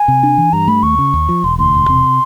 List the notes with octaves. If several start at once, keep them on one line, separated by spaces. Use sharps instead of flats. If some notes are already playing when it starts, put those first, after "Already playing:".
Already playing: G#5
C3
D4
E3
G2 A#5
A3 B5
D#2 C#6
C#3
D#2
F3
E1 C6
D2 C6
E1
C3